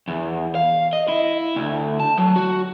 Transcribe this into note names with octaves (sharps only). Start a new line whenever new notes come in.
E2
F5
D#5
E4
D2
A5
F#3
F#4